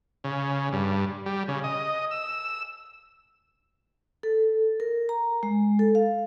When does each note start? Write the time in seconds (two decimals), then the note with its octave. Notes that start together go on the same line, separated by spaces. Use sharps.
0.24 C#3
0.73 G2
1.26 G3
1.48 C#3
1.64 D#5
2.11 E6
4.23 A4
4.80 A#4
5.09 A#5
5.43 G#3
5.79 A4
5.95 F5